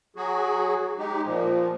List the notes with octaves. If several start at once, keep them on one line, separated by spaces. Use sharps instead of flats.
F#3 F#4 G#4
G#3 D#4 G4
A#2 F3